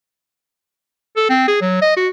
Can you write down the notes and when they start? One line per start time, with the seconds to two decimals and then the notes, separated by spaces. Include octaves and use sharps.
1.16 A4
1.30 C4
1.48 G#4
1.61 F#3
1.82 D#5
1.97 F#4